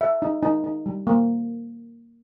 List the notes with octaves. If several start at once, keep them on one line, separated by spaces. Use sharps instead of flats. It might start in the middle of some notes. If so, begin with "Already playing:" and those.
E5
D#4
D#4
D#4
G3
A#3